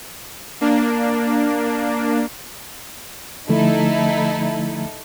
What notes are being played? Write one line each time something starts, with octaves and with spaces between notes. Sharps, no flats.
A#3 D4
D3 F3 A3 D#4 E4 A4